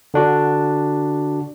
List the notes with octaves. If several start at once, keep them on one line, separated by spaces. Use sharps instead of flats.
D3 D4 F#4